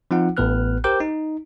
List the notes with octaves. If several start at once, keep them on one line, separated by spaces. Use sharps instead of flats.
F3 C4 D#4 F4 F#5
A1 A2 B3 B4 F6 F#6
G4 A#4 C5 G5 D6 G6
D#4